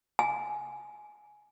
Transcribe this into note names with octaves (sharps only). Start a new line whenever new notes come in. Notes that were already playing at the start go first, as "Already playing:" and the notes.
G#5